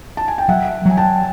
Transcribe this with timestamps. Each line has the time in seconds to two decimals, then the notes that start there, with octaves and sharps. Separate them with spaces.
0.17 A5
0.28 G#5
0.38 G5
0.48 F#3 E5 F#5
0.86 F#3 G#5
0.97 G5 A5